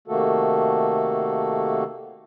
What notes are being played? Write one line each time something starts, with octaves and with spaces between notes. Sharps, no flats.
C3 D#3 A3 A#3 F#4 A4